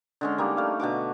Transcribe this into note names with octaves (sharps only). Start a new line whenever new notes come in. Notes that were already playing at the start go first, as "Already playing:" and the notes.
D3 G#3 C#4
G3 A#3 D#4
A3 F5
B2 D3 F#4 D6